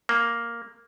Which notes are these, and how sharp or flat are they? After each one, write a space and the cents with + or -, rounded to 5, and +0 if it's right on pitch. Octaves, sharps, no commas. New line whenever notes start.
A#3 +0